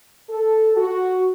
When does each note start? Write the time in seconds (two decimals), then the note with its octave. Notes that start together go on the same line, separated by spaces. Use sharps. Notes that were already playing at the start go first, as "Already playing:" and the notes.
0.30 A4
0.76 F#4